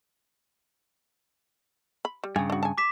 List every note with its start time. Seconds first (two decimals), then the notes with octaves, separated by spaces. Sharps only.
2.05 B5
2.24 G3
2.36 G2 C#3 G#5
2.50 D4 F#4
2.63 G#5 A5
2.78 D6 B6 E7